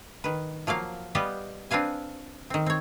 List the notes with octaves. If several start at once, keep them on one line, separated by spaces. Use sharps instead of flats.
D#3 B4
F3 F#3 A#3 F5
G3 B3 G4 B4 D#5 F5
C4 D4 B4 F5 G#5
D#3 C4
C4 C#5